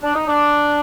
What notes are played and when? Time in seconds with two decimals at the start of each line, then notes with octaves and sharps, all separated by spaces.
0.03 D4
0.15 D#4
0.27 D4